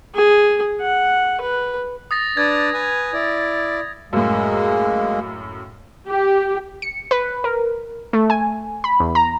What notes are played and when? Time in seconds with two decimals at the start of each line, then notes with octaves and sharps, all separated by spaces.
0.15 G#4
0.81 F#5
1.41 B4
2.11 D#6 A6 A#6
2.37 D4 B4 D5 G#6
2.73 B4 G#5
3.13 E4 D5
4.13 F#2 A2 G#3 A#3
6.08 G4
6.82 C#7
7.11 B4
7.44 A#4
8.13 A3
8.30 G#5
8.84 B5
9.00 E2
9.15 A#5